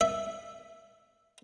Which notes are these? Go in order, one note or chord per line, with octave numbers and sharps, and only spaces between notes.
E5